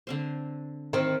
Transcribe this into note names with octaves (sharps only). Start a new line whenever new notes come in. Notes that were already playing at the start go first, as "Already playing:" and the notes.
D3 C4 C5
D#3 C4